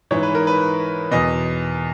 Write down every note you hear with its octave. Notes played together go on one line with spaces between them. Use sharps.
G#2 E3 C#5
B4
A#4
B4
E2 B2 D#5